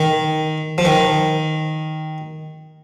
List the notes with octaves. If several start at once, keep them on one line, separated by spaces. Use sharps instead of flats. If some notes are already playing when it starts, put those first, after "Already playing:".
Already playing: D#3
F3
D#3